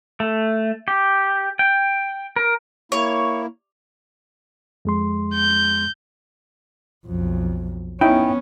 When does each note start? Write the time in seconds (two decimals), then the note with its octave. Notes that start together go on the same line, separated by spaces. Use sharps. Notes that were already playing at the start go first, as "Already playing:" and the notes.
0.20 A3
0.88 G4
1.59 G5
2.36 A#4
2.92 A#3 E4 C#5
4.85 F2 G#3 C6
5.34 G6
7.06 B1 F2
8.01 B3 C#4 D#4 E4 G5